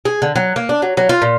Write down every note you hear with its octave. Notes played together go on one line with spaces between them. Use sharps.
G#4
D3
F#3
A#3
D4
F#3
F#3
F4
A#2